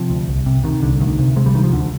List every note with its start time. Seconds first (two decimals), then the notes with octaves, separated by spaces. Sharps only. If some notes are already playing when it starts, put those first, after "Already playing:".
Already playing: C3 F3
0.10 D2
0.29 C2
0.46 C3
0.64 C3 D#3
0.82 C2 D3
1.00 D2 D#3
1.19 C3
1.36 C3 G#3
1.46 G3
1.54 D2 D#3
1.64 F3
1.72 D2 D3